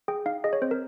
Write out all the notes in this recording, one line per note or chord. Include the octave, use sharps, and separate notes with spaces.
G#4 G5
D#4 F5
G#4 D#5
C#5
C4 C5
A#4